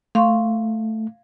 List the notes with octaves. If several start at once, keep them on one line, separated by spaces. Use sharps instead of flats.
A3 F5 C6 C#6